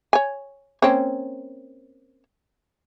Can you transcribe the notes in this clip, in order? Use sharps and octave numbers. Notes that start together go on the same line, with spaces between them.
C#5 G#5
A#3 C4 C#4